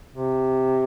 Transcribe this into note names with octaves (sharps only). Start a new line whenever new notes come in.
C3